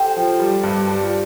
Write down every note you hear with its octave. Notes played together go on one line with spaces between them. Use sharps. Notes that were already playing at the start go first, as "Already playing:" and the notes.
Already playing: G4 A4 C5
F3
G3
G2
G3 D4
F4